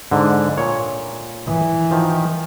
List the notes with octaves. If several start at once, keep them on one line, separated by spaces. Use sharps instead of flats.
G#2 D3
A#2 C#5
E3
D#3 F3